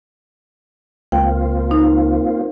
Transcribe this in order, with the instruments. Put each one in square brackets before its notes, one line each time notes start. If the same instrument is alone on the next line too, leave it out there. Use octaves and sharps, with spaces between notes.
[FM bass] C#2 [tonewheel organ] A#3 C4 F4 [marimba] G5
[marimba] D#4